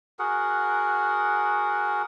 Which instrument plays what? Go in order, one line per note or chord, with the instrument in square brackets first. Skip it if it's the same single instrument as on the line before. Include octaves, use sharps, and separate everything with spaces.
[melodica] F#4 G#4 A#4 F#5